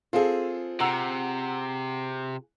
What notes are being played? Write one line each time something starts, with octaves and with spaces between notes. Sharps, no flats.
C4 F4 G#4 A4
C3 F#5 A#5 E6